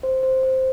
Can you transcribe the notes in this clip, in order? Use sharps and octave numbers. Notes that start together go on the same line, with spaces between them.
C5
C5
C5